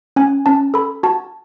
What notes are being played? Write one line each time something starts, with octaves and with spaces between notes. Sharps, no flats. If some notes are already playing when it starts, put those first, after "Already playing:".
C#4 G#5
C#4 A5
A4 B5
F#4 A5